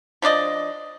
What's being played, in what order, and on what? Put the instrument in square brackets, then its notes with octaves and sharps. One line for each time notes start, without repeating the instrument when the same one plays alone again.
[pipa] F3 D4 D5 D#5